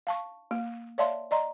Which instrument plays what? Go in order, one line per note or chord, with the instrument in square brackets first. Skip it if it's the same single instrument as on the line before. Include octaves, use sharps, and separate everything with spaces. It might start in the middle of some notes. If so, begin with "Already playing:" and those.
[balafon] F5 A5 C#6
A#3
C#5 D5 E5 F5 A5 C6
D5 D#5 A#5 C6